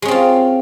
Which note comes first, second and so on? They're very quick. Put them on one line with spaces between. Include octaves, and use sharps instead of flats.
G#3 C#4 C4 F4